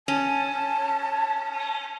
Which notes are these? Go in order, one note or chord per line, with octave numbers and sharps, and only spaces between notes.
C#4 A5